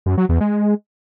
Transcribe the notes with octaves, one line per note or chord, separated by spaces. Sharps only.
F#2
F#3
E2
G#3